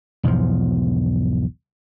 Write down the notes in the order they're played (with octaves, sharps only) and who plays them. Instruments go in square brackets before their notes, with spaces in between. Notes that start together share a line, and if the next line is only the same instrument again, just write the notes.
[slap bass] B1 E2 G#2 F3